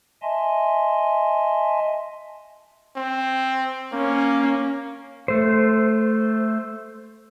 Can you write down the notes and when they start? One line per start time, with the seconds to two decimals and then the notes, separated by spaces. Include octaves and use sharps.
0.22 D#5 E5 G#5 A5 C6
2.96 C4
3.93 A#3 C#4
5.28 A3 C5